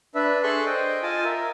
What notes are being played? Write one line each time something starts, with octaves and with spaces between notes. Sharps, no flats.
D4 B4 E5
G#4 A4 C6 C#6 E6 F#6
C5 D#5 G5
F4 D#5 G#5 A5
A#4 E5